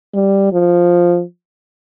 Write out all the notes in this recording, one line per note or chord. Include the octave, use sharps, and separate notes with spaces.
G3
F3